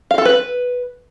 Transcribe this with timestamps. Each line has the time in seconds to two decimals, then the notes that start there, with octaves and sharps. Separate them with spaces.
0.11 F5
0.18 A4
0.25 B4